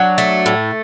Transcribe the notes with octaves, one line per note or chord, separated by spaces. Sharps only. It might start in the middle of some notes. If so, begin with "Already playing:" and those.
Already playing: F#3 D4
A3
A2